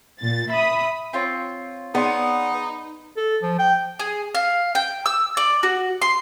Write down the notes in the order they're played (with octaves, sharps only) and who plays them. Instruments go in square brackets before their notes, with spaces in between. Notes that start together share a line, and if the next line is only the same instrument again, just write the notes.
[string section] A#2 A6
E5 B5 D#6
[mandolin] C4 F4 C#5
[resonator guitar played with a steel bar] B3 [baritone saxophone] D#4 [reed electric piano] G#4 D5 C6
[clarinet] A4
F3
G5
[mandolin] G#4
F5
G5
E6
D5
F#4
C6